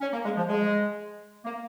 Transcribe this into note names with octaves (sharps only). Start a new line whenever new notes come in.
C#4
A#3
G#3
F3
G#3
A#3